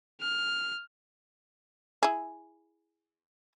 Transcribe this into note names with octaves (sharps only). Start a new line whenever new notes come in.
F6
E4 G#4